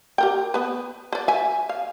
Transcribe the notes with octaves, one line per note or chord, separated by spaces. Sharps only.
G4 A#4 G5
B3 B4
B4 D5
E5 G#5
F5